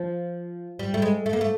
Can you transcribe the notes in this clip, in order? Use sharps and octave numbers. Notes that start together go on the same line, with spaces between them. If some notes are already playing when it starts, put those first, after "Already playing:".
Already playing: F3
G3
A3
G#3
A3
A#3
A3